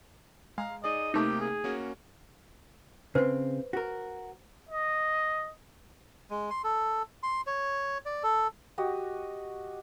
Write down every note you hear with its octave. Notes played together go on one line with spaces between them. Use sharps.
G#3 F5 A#5
D#4 G#4 D5 D#5
C3 A3 A#3 D#4 G4 D#6
G#4
A#3 C#4 F#4
C#3 C4 B4 C5
F#4 A#4
D#5
G#3
C6
A4
C6
C#5
D5
A4
F#4 G4 D#5